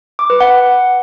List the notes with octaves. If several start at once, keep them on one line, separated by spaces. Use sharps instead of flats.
D6
B4
F#5